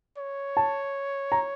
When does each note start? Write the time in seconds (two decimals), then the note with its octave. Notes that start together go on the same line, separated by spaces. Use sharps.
0.18 C#5
0.57 A5
1.32 A#5